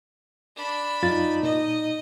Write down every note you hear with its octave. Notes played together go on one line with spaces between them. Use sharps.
D4 B5
F#2 D#4 F4 A6
A#2 D#5